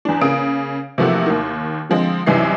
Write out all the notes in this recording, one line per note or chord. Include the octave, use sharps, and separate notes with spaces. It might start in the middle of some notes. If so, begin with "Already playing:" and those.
E2 D4
C#3 A#3 D#6 D7
C3 E3 F3 A3 A#3 F#4
D#2 D#3
D3 F3 G#3 C4
C2 F#2 C3 E3 D#4 C7